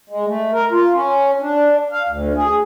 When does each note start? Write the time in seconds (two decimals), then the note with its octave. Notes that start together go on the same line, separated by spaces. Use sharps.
0.10 G#3
0.26 A3
0.53 A#4
0.71 F4
0.93 C#4
1.40 D4
1.92 F5
2.08 D2
2.36 G#4